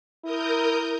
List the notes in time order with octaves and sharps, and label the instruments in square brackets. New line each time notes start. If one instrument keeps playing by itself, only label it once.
[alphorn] E4 [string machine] A#4 D#6 G6